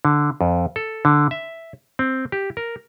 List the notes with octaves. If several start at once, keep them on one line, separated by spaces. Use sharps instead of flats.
D3
F2
A4
D3
E5
C4
G4
A#4